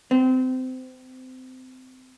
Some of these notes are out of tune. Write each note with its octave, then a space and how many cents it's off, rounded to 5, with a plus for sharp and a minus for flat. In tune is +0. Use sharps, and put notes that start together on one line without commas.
C4 -25